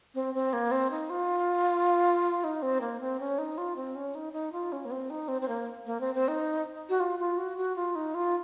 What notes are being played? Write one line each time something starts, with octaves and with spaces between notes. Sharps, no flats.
C4
C4
A#3
C4
D#4
F4
D#4
C4
A#3
C4
C#4
D#4
F4
C4
C#4
D#4
D#4
F4
C#4
A#3
C4
D#4
C4
C4
A#3
A#3
C4
C4
D#4
F#4
F4
F4
F#4
F#4
F4
D#4
F4